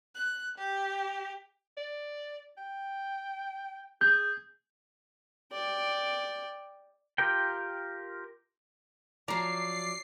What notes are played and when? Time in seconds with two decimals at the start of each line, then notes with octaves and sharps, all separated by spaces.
0.14 F#6
0.58 G4
1.77 D5
2.58 G5
4.01 G#4 G6
5.52 D5 G5
7.18 F4 G4 A#4 G5
9.28 F3 F#3 D5 A#5 C7